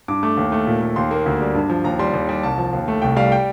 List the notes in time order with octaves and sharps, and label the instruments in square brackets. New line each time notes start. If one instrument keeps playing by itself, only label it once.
[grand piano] G2 D6
A3 D6
D#2
A3
A#2
A3
D#2 C6
A#3
D2
G3
G2
F3
D#2 A#5
G3 C6
D#2
G3
C2 A5
F3
D#2
A3
C2 G5
G3 F5
G5